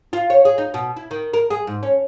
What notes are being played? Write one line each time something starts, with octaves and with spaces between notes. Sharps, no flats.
F4
C#5
G#4
D#4
B2
E4
D#3
A#4
G#4
G#2
C#4